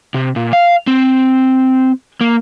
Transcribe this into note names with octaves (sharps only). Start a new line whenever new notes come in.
C3
A#2
F5
C4
A#3